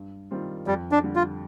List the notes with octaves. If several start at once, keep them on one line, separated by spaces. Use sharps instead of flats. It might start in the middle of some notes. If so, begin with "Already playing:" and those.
Already playing: G2
D#3 G3 C4 F4
F2 G3
D4
D3 G3 D4
F4